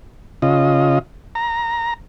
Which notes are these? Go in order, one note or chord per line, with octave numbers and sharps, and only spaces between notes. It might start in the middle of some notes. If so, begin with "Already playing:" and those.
C#3 F4 D#5
A#5